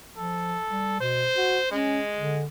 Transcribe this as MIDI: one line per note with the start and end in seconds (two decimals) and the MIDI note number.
0.17 0.56 53
0.17 0.99 69
0.69 0.99 55
1.01 1.26 47
1.01 1.68 72
1.37 1.58 66
1.71 2.40 56
1.71 2.00 61
2.17 2.45 50